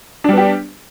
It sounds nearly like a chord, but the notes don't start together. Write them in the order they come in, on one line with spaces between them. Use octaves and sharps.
D4 G3 B3 G4